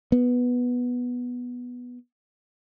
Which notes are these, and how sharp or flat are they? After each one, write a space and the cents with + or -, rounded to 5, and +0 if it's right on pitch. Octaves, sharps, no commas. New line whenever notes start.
B3 -5